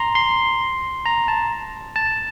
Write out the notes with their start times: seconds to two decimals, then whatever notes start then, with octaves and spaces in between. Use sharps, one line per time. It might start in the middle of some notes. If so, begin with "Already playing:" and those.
Already playing: A#5 C6
0.15 C6
1.06 A#5
1.28 A5
1.96 A5